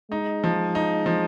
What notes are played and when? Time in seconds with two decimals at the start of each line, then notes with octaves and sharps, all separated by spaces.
0.11 G#3 D#4
0.44 F3
0.75 D#4
1.06 F3